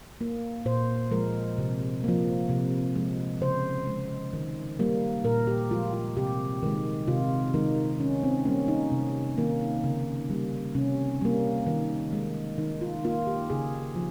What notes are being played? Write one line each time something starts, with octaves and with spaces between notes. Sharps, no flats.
A#3
A#2 C5
F3 G#3 A#4
C3
F3 A#3
C3
F3 G#3
C#3 C5
G#3
D#3
G3 A#3
A#2 A#4
G4
F3 G#3 F4
F4
C3 G4
D#3 G#3
C3 F4
D#3 G#3 D#4
D#3 C#4
C4
G3 A#3 C#4
D#4
C3
D#3 A#3
C#3
G3 A#3
C3 C#4
G3 A#3
D#3
G#3
D#3 D#4
F4
A#3 F4
G4
C#3 G#4
F3